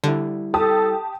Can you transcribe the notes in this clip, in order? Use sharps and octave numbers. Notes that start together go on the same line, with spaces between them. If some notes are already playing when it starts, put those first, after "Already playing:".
D3 G3 E4
G4 A4 A5 D#6